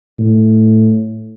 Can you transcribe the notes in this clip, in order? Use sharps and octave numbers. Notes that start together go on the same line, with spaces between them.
A2